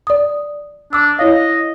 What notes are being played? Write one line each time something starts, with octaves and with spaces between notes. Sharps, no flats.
D5 D#6
D4 D6 E6
E4 C#5 D#5 F5